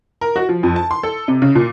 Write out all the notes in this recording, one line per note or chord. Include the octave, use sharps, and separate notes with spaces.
A#4
F#4
F3
F2
A5
C6
A4
C3
C#3
A#2